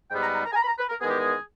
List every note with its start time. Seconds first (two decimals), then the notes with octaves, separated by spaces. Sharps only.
0.10 G#2 G3 B3 G5
0.22 A#5
0.33 A#5
0.44 A#5
0.51 G#5
0.55 A#5
0.62 B5
0.67 A#5
0.78 B4
0.89 A#4
1.01 E2 D#3 G#3 B3 G#4
1.09 G4
1.18 G#4